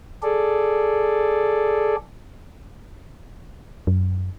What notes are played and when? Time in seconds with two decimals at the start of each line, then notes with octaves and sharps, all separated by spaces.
0.23 G#4 A4 D5
3.87 F#2